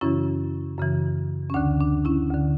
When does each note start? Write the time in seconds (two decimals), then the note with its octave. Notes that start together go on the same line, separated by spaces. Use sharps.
0.01 F#2 C#3 E3 C#4 E4
0.78 F#2 C#3 E3
1.50 C#4
1.54 D2 D3 D4
1.80 D4
2.05 C#4 E4
2.31 D2 D3